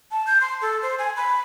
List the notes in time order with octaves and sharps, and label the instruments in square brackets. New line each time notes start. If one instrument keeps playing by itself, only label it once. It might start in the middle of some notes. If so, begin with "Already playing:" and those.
[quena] A5
G6
C6
A4
C5
G#5
B5